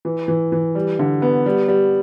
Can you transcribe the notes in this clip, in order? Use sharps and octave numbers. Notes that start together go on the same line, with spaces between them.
E3
E3
E3
G3
D3
B3
G3
G3